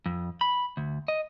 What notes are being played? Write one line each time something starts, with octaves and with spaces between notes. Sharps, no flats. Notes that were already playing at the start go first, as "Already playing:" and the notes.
F2
B5
D2
D#5